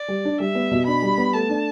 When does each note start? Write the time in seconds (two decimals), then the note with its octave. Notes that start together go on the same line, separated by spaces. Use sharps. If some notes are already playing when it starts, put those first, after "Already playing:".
Already playing: D5
0.08 G3
0.25 D4
0.40 G3 E5
0.55 B3
0.71 B2
0.87 D4 B5
1.02 G3
1.18 B3
1.33 A3 A5
1.49 D4